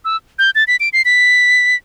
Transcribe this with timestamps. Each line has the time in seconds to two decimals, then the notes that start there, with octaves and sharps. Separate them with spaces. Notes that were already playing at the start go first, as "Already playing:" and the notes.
0.05 E6
0.39 G6
0.55 A6
0.67 B6
0.80 D7
0.93 C7
1.05 B6